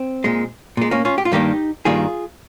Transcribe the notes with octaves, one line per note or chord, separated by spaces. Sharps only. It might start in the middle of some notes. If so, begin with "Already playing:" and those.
Already playing: C4
A#2 G#3
A#2 G#3
A#3 C#4
C#4 F4
G4
F4
G2 D#3 G3 A#3 D#4 G4
G2 D#3 G3 A#3 F4 G#4